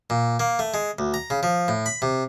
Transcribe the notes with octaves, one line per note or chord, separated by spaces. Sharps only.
A#2
A#3
A3
G#3
D2
A#5
C#3
F3
A2
B5
C3